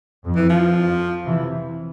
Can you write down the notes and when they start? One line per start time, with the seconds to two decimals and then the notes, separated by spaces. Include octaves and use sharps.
0.24 F2
0.36 E3
0.50 F3
0.75 F2
1.25 C3 E3